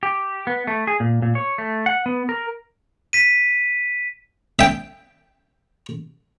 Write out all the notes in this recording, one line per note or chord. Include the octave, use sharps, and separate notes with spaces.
G4
B3
A3
G#4
A#2
A#2
C#5
A3
F#5
B3
A#4
B6 D#7
E5 G5